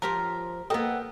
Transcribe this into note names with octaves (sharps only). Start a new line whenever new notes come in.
F3 G4 A#4 C5
A#3 B3 A4 A#4 D#5 G5